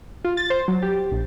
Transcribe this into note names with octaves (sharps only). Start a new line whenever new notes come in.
F4
A6
C5
F#3
G4
A#1